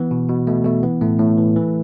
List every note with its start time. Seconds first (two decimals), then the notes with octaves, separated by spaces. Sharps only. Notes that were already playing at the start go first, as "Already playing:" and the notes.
Already playing: E3 B3
0.11 B2
0.29 B2
0.47 B2 A3
0.65 B2 A3
0.83 E3 B3
1.01 A2 A3
1.19 A2 A3
1.38 E3
1.56 E3